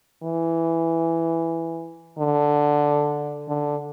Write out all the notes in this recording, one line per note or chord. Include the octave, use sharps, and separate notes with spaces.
E3
D3
D3